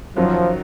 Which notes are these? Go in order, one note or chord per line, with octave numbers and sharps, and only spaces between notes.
F#2 D#3 F3 F#3